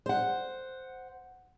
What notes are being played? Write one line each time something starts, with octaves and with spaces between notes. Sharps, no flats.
C5 F#5